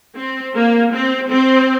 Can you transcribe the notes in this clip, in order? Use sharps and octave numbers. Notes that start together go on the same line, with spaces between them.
C4
A#3
C4
C4